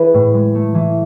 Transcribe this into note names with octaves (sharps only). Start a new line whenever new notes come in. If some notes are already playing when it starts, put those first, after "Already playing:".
Already playing: E3 G#4 B4
A2
G#3
A3
E3